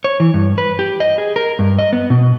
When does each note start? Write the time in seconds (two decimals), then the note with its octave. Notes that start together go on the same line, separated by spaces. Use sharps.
0.04 C#5
0.20 E3
0.34 G2
0.58 B4
0.79 G4
1.00 D#5
1.18 G#4
1.36 A#4
1.59 G2
1.79 D#5
1.93 B3
2.10 B2